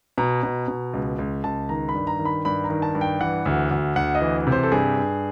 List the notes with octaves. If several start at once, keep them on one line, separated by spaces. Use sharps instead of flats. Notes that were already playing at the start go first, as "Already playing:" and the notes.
B2 A#5
B2
B2
C#2
C#2
C#2 A5
D#3 A#5
B5
G2
A#5
D#3
B5
G2 B5
A#5
D#3
A5
G2
G5
E3 F#5
D2
D2
D2 F#5
D#5
E3
C3
C5
A4
G2 G#4
G2